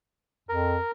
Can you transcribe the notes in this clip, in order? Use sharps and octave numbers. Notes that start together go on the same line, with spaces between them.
F2 A#4